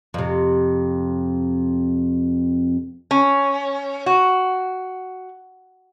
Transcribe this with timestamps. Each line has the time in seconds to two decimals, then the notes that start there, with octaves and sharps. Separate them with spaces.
0.14 F2 C3
3.11 C#4
4.06 F#4